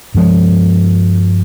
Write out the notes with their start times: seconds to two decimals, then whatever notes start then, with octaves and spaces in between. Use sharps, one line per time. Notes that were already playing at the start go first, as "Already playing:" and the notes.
0.15 G2 F3 G#3